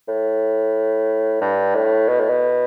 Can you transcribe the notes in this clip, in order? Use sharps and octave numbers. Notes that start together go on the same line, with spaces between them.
A2
G2
A2
B2
A2
B2